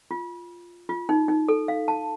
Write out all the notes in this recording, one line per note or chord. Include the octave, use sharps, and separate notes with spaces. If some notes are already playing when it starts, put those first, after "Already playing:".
F4
F4
D#4
D#4
A4
F5
A5